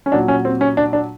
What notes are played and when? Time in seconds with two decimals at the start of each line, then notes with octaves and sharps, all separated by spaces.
0.06 C#4
0.12 A#2 F#3 D4
0.28 C#4
0.45 C4
0.61 C#4
0.77 D4
0.93 D4